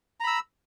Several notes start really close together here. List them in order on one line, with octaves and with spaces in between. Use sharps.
A#5 B5 E6